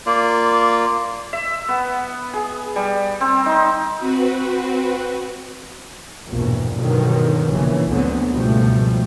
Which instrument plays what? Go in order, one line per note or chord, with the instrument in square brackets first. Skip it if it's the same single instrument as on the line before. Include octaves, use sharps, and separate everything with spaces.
[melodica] A#3 F4 D5
[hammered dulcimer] E5
B3
G#4
G3
C4
D#4
[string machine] C4 F#4 B4
[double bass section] A#1 E2 G2 B2
G2 B2 D3 D#3 F3 F#3
A#1 C#3 E3
D2 D3 F#3 B3 C4
C#2 G#2 B2 F3 G3 A3